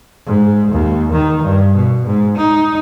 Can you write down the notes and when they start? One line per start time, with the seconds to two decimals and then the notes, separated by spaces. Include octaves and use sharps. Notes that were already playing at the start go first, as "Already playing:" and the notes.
0.26 G#2
0.71 D#2
1.12 D#3
1.43 G2
1.75 B2
2.06 G#2
2.37 D#4